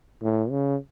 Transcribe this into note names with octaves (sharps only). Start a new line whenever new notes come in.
A2
C#3